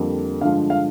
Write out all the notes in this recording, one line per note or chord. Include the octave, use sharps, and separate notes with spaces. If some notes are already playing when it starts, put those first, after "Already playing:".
Already playing: F2 D3 G3 A#3
G2 D3 F3 G#3 F5
F5